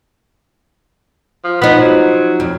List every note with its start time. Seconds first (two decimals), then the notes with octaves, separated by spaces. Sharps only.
1.44 F3
1.62 F3 B3 D#4
1.81 F#3
2.40 F2